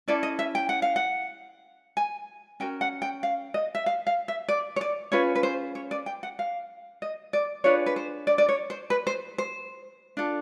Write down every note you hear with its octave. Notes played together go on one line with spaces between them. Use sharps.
C#4 E4 A4 D5
D#5
E5
G5
F#5
F5
F#5
G#5
C#4 F#4 A#4 G5
F#5
G5
F5
D#5
E5
F5
F5
E5
D5
C#5
D5
C#4 F4 G#4 B4 C#5
B4
C5
C#5
D5
G5
F#5
F5
D#5
D5
D4 F4 G#4 B4 C#5
B4
C5
D5
D5
C#5
C5
B4
C5
C5
D4 F4 A4